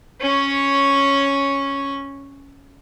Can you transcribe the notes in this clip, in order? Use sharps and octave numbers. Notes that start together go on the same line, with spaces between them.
C#4 C#5